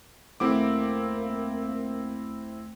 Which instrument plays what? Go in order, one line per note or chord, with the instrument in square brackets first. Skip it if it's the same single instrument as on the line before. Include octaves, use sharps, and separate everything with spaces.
[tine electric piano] D#2 A3 F#5 [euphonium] A#3 [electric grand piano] C4 E4 D6